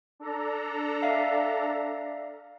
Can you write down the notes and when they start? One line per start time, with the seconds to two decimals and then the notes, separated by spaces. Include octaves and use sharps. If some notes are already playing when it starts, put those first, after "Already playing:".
0.20 D4 A4 A#5
1.02 D5 E5 F5